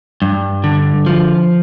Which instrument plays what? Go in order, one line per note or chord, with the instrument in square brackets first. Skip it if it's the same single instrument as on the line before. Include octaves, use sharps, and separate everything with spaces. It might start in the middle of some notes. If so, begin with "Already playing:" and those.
[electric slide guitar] G2
D3
F3